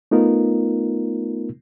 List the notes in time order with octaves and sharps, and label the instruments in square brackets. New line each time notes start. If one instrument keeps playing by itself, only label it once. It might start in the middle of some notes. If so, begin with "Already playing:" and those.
[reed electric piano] A3 B3 D#4 F4 A#4